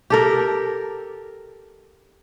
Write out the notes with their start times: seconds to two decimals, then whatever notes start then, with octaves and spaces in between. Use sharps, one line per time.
0.10 G4 A4 A#4